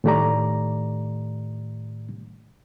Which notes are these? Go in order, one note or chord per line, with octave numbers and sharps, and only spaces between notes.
A2 D#3 A3 G4 D5 A#5